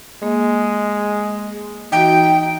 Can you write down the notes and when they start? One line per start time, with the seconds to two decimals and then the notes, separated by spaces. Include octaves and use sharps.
0.23 G#3 A#3 D#5
1.92 E3 D#4 F#4 G5